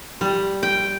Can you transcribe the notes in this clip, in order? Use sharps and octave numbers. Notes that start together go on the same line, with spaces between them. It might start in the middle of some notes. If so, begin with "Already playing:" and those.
G3
G5